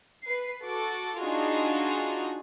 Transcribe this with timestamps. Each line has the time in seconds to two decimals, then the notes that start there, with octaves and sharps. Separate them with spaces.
0.25 B4 C7
0.66 F#4 A4 D6
1.22 D4 D#4 F4 F#4 G#4